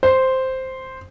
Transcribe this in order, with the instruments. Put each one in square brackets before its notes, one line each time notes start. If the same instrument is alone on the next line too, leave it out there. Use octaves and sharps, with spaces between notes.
[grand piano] C5